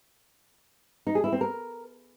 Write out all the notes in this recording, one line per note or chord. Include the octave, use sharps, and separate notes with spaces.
D#4
G#4
E4
C4
A#4